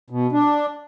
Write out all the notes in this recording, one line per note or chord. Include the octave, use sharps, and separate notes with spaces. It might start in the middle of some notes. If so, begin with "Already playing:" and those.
B2
D4